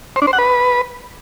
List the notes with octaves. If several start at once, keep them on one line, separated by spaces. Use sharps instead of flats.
C5
D4
C5
F#5
B4